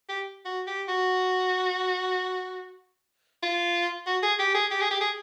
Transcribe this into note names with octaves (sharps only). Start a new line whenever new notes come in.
G4
F#4
G4
F#4
F4
F#4
G#4
G4
G#4
G4
G#4
G4
G#4